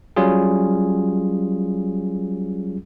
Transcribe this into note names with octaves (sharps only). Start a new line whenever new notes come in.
F#3 G3 C#4 F4 G#4